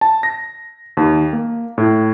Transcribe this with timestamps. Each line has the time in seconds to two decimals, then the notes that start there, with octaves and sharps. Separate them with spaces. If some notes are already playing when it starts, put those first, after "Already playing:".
0.01 A5
0.23 A#6
0.97 D#2
1.33 A#3
1.78 A2